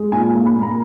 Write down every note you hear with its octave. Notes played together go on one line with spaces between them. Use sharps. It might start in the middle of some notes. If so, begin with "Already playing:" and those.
Already playing: G#3
A#2 G#5
A#3
B5
A#3
A#5